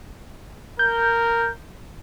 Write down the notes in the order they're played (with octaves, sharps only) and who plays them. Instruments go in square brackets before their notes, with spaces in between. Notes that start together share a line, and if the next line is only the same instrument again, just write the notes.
[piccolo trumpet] A#4 [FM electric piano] G6